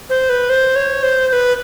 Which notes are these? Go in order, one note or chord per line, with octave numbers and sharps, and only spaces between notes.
C5
B4
C5
C#5
C5
C5
B4